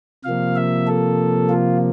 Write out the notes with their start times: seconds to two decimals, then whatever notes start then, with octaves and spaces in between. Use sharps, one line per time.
0.24 C3 F3 A#3 F5
0.55 E5
0.87 A4
1.49 F4